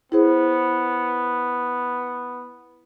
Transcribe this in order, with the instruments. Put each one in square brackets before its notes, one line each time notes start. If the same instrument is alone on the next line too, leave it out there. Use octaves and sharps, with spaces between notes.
[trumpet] B3 [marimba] E4 G#4 C5